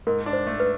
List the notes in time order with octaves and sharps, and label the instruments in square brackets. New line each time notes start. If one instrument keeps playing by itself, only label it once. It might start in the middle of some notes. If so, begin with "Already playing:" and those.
[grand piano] G#2 [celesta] A#4
[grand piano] D4
[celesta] C5
[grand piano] A3
[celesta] B4